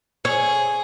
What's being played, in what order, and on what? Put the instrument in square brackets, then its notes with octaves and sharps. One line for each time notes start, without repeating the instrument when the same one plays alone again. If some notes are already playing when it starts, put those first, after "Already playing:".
[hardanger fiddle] G#4 [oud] C#5